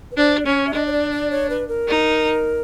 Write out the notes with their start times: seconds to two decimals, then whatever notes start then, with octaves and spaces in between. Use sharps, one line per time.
0.11 B4
0.17 D4 C5
0.39 D5
0.46 C#4 C#5
0.67 E5
0.73 D4 D#5
0.87 C#5
0.93 D5
1.12 D5
1.31 C#5
1.50 B4
1.69 A#4
1.87 D#4